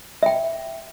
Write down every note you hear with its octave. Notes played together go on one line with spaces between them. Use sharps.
E5 G5